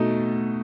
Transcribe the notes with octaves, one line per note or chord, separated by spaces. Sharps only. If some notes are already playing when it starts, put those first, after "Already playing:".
Already playing: B2 A3 D#4